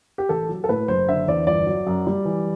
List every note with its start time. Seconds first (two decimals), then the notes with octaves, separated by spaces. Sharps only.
0.18 G4
0.29 A1 A4
0.49 F#3
0.64 A4
0.69 A2 B4
0.88 F#1 C5
1.08 D3 E5
1.28 E2 D5
1.47 G1 D5
1.66 F#3
1.87 F#2
2.07 G3
2.25 E3